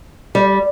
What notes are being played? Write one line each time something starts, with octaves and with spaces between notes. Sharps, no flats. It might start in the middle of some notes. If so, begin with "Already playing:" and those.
G3